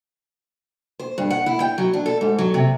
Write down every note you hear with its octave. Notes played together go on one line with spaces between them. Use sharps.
C5
G2
F#5
E4
G5
F#3
D4
A4
G#2
F#3
C3